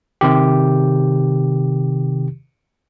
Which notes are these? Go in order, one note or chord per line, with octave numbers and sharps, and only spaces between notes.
C3 D#3 G4